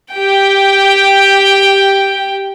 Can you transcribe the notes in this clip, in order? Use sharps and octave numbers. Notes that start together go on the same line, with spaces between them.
G4 G5